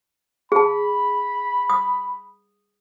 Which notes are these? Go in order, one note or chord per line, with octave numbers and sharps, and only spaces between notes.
G#4 A5 B5
D#6